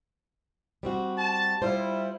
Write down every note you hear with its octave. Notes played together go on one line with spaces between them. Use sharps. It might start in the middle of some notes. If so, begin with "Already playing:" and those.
G3 C4 F#4
A5
G3 E4 F4 C5